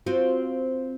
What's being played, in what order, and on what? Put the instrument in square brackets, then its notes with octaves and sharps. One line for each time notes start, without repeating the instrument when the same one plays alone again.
[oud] C4 F4 F#4